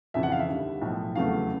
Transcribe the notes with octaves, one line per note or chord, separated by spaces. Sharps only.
F2 C#3 E3 E5
F#5
F5
E5
D#2 D3 G3
B1 A2 F3
F1 E2 C#3 F#3 A3 F5